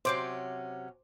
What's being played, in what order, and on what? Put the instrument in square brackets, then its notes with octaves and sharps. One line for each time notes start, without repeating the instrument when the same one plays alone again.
[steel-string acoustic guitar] C3 F#3 C#4 [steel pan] C5 D6